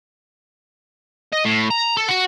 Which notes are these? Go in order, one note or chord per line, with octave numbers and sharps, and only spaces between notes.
D#5
A2
A#5
A4
F#4 F#5